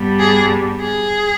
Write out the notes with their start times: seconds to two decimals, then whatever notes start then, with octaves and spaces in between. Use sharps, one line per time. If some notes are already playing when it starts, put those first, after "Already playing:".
Already playing: G2 G3 B3
0.19 G#4
0.81 G#4